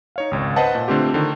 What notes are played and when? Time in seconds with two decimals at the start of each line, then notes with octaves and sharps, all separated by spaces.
0.16 D#4 C#5 F5
0.31 G#1 C#2
0.56 B4 C5 D#5 F#5 A5
0.75 A#2
0.88 D3 A3 C4 F4 G4
1.14 D3 D#3